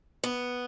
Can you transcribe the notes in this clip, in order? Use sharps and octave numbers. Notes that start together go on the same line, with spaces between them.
B3